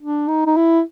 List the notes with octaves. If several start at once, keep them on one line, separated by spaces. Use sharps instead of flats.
D4
D#4
D#4
E4